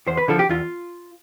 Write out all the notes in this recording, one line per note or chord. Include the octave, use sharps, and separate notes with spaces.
E2 C5
B4
D3 F3 A4
G4
E2 F4